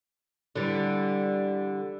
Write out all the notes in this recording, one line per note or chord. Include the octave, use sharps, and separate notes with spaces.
D3 E3 G3